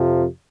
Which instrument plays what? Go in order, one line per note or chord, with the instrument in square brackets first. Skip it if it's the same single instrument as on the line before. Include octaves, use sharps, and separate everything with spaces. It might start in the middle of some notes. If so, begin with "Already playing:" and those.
Already playing: [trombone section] F2 C3 F3